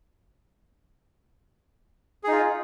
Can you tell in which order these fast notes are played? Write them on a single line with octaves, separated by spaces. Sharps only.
G#4 D#4 F4